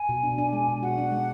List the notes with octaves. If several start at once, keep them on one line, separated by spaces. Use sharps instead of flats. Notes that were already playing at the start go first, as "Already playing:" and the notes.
Already playing: G#5
B2
D4
D4
G#3
B2
F#4 F#5
D4
G#3